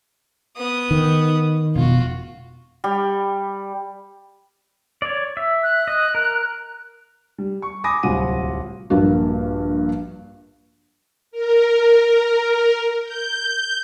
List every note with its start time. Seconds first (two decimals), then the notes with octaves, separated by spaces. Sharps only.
0.57 B3 D#6
0.91 D#3
1.76 F1 B2 F4 F#4
2.84 G3
5.02 C#5 D5
5.37 E5
5.63 F#6
5.88 D#5
6.15 A#4
7.38 G3
7.62 C#6
7.84 G#5 B5 D6 D#6 A#6
8.03 D1 C2 F#3 F4 F#5 D#7
8.90 A#1 G2 A#3 F#4
11.31 A#4
13.04 G6